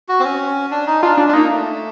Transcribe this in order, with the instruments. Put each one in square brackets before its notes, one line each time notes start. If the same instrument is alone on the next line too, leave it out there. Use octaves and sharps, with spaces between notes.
[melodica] F#4
C4
C#4
D4
D#4
[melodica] D4 [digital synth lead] F4
[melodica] C#4 [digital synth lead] D4
[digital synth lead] D4
[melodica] A#3 [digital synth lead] D#4
[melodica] A3